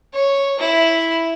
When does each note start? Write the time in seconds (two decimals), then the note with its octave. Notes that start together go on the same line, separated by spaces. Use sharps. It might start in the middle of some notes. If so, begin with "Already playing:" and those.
0.13 C#5
0.59 E4